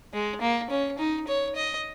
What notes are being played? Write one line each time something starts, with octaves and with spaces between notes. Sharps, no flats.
G#3
A#3
C#4
D#4
C#5
D#5